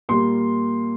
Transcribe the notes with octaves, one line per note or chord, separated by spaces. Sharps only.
A#2 G3 A#3 C6